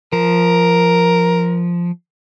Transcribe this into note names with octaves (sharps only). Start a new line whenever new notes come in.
F3 A#4